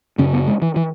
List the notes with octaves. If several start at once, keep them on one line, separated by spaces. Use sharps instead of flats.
F#2 C#3 C#4
B3
G#3
E3
E3